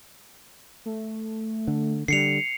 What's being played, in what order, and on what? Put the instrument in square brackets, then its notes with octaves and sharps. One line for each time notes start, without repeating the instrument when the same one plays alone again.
[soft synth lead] A3
[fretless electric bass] D3
[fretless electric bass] D3 G3 [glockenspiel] C7 C#7 F7